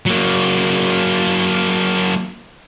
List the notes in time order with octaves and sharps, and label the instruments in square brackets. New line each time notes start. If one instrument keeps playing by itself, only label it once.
[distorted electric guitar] F#3 A#3